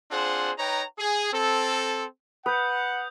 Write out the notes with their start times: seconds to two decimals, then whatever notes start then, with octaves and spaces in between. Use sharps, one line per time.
0.11 C4 D4 F4 G#4 C5 F#5
0.58 D#4 B4 C#5 G5 A#5
0.99 G#4
1.33 C4 A4
2.46 B4 F#5 D#6 G6